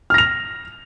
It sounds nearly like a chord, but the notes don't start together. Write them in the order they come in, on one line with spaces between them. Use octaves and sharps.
F6 A#6 F7